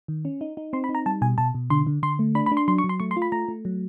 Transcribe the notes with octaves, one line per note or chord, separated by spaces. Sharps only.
D#3
C#4
D#4
D#4
C4 C6
B5
D#4
A#5
G3 A5
B2 G#5
B2 A5
B2
D3 C6
D3
D3 C6
A3
D4 B5
B5
D4
C6
F#3 C6
C#6
F#3
C6
A3 C#6
C6
F4
B5
A3 A#5
A3
F#3